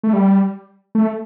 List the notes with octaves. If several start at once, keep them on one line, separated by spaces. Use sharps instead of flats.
A3
G3
A3